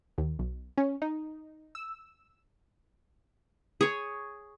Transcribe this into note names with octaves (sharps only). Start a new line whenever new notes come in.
D#2
B1
C#4
D#4
E6
G#4 C#5